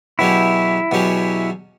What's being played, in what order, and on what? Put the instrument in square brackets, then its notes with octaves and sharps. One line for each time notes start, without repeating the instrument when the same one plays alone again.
[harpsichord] E2 B2 F#3 C#4 G4 [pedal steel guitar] E4
[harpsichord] E2 B2 F#3 C#4 G4